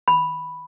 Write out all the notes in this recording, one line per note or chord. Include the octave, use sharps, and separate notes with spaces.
B5